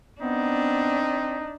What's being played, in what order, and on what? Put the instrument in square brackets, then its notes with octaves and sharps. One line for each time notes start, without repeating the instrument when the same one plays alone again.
[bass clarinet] B3 [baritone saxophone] C4 [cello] D4 [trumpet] D#4